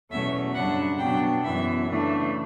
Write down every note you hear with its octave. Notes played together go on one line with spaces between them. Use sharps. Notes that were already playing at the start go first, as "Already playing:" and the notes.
E2 B2 F#3 A3 C#4 E5
F#2 C#3 G3 D4 F#5
B2 F#3 B3 D4 G5
F#2 E3 B3 E5
C#3 E3 A3 D4